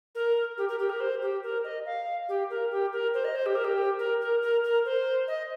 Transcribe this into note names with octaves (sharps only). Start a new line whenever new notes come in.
A#4
G4
A#4
G4
A#4
C5
G4
A#4
D#5
F5
G4
A#4
G4
A#4
C5
D#5
C5
G4
A#4
G4
A#4
A#4
A#4
A#4
C5
D#5